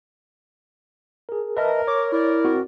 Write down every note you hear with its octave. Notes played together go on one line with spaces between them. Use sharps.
G#4 A#4
A#4 B4 D#5 E5 A5
C#5 D6
E4 A#4 D5
C4 F#4